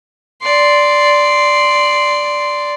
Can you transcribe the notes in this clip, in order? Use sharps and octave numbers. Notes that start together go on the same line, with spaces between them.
D5 C6